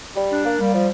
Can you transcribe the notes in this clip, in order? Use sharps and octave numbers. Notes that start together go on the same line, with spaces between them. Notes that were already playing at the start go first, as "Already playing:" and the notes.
G3
D4
A#3
G3
F3